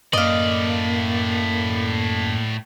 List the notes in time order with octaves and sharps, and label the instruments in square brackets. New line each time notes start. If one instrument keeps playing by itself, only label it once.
[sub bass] F#2 [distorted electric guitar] A2 D5 [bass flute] A#3 [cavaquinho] D#5 F5